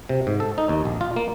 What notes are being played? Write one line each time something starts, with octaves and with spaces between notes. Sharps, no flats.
C3
G#2
A4
D#4
D#2
A#1
F4
A#3